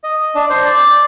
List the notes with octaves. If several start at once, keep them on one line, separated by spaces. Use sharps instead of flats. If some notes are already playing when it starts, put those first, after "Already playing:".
D#5
D4
C5
D5